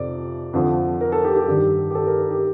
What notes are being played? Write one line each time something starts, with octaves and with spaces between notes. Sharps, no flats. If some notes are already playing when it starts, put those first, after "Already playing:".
Already playing: F2 C3 F3 D5
F2 D3 F3
A#4
A4
G4
G4
G2 D#3 G3
G4
A4
A#4
A#4
G4